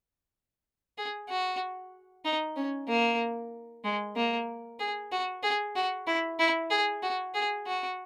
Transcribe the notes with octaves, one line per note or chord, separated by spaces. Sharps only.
G#4
F#4
D#4
C#4
A#3
G#3
A#3
G#4
F#4
G#4
F#4
E4
E4
G#4
F#4
G#4
F#4